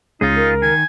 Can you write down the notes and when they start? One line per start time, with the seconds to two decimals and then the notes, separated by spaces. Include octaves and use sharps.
0.21 C#2 C#3 G#3 D#4 F4 G#4
0.36 A#4
0.62 D#3 G#5